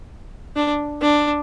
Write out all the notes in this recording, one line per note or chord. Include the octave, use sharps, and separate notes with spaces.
D4
D4